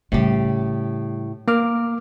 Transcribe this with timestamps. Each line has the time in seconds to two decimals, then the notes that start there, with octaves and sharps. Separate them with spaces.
0.12 A2 C#3 G3 G4
1.48 A#3 A#4 D6 F6